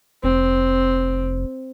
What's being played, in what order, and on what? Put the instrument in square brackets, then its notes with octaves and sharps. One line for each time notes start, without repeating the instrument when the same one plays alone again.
[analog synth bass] F1 [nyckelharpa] C4